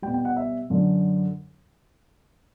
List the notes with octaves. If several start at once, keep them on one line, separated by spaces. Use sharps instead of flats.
G3 G5
B2
G5
F#5
E5
F#2 D3 F#3